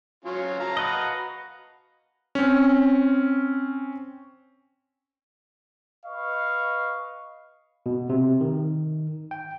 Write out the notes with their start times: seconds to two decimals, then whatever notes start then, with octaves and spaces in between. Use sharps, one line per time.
0.25 F#3 C#4 F4
0.60 F5 A5 A#5
0.77 F#4 B4 D#5
2.35 C4 C#4
6.06 B4 D#5 F5 C#6
7.86 B2
8.09 C3
8.41 D#3
9.31 G5